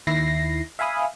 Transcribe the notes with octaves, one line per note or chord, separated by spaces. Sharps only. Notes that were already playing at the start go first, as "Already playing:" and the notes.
D#2 D#3 E4 A#6 C7
E5 F5 G#5 B5 D#6